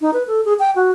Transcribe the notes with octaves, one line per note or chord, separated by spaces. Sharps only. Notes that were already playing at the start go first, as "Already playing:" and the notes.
D#4
B4
A4
G#4
G5
F#4